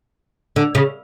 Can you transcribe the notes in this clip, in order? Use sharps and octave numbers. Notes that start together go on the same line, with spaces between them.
D3
C#3